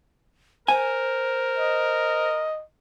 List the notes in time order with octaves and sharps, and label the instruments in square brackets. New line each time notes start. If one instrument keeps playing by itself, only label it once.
[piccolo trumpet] A#4 [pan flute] C5 [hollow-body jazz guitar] G#5
[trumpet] D#5